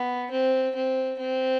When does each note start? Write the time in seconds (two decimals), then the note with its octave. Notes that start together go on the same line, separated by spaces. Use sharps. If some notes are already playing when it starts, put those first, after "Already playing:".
Already playing: B3
0.31 C4
0.75 C4
1.18 C4